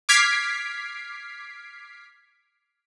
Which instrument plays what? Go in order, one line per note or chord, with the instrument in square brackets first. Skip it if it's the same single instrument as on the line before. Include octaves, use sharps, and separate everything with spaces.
[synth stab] D6 F6 G#6 B6 C7 D7